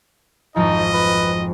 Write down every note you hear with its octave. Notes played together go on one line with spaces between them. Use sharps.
G#1 F2 F3 D#4 D#5
B4